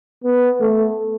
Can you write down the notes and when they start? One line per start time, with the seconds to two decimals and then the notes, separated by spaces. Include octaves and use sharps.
0.24 B3
0.60 A3